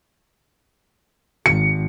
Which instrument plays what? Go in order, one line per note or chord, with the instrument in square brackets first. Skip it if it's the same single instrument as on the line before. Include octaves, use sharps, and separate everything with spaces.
[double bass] G#1 [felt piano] C#7